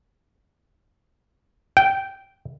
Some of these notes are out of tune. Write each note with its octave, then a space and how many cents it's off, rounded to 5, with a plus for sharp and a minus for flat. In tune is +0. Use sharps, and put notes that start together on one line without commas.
G5 -10